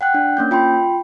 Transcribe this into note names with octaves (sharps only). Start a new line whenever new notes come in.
F#5 G5 F#6
D4
A#3 C#4 G6
F4 G5 B5 C6